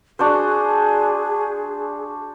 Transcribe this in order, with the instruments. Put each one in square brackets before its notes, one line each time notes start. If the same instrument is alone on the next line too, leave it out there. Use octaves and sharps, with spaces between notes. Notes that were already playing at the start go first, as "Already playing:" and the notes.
[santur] D4 F#4 C5 [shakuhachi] G#4